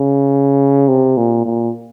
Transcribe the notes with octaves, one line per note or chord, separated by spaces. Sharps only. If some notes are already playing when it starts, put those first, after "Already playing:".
Already playing: C#3
C3
A#2
A#2